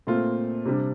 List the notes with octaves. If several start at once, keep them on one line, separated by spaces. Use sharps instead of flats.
A#2 A3 C4 F4
C3 G3 D4